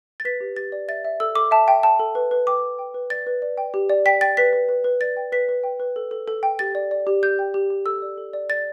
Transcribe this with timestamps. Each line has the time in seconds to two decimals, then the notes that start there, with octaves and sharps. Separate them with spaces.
0.20 A6
0.25 B4 B6
0.41 G4
0.56 G4 A6
0.72 D5
0.88 E5 A6
1.05 E5
1.20 A4 E6
1.35 A4 D6
1.51 E5 A5
1.67 E5 G5
1.83 G5 A5
1.99 A4
2.15 B4
2.31 B4
2.47 G5 D6
2.62 B4
2.79 G5
2.94 B4
3.10 D5 A6
3.26 B4
3.42 D5
3.58 G5
3.74 G4
3.89 D5
4.06 G5 B6
4.21 G5 A6
4.37 B4 B6
4.53 B4
4.69 B4
4.84 B4
5.01 D5 A6
5.17 G5
5.32 B4 B6
5.49 B4
5.64 G5
5.80 B4
5.96 A4
6.11 A4
6.28 A4
6.43 G5
6.59 G4 A6
6.75 D5
6.91 D5
7.07 G4
7.23 G4 G6
7.39 G5
7.54 G4
7.70 G4
7.86 A4 E6
8.02 D5
8.18 A4
8.33 D5
8.50 D5 A6